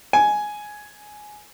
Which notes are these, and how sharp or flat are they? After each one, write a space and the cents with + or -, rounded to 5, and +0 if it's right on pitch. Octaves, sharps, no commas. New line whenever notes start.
G#5 +10